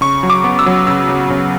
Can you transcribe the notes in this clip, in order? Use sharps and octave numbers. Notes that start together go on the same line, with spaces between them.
C#3 C#6
F#3
D6
B3
E6
F#3
C#3 E6
C#3
C#3